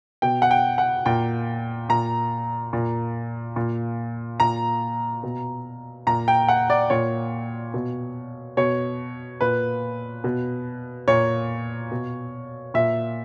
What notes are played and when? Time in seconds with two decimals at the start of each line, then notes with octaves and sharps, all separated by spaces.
0.22 B2 G5
0.42 F#5
0.51 G5
0.78 F#5
1.06 A#2 G5
1.89 A#2 A#5
2.73 A#2
3.56 A#2
4.40 A#2 A#5
5.23 B2
6.07 A#2 A#5
6.28 G5
6.48 F#5
6.70 D5
6.90 A#2 C#5
7.74 B2
8.57 B2 C#5
9.41 A#2 B4
10.24 B2
11.08 A#2 C#5
11.91 B2
12.74 A#2 E5